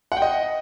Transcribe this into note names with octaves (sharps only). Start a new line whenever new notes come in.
F#5
G5
D#5